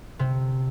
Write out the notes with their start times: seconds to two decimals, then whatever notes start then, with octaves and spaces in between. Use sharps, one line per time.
0.19 C3